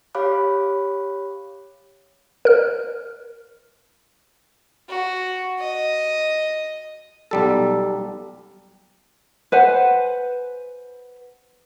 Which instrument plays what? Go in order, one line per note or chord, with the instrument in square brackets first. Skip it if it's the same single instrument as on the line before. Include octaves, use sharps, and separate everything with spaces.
[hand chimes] G4 C#5 F5 B5 D6 F#6
[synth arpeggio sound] A#4 F6
[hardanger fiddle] F#4
D#5
[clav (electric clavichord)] B1 G3 A4
[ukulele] B4 C5 F#5 G#5